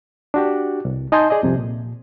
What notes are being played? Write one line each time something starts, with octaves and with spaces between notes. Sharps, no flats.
D4 F#4 G4
C2
D#4 D#5 G#5 A5 C6 G6
G#4 D5 D#5
C2 F2 C3
A#2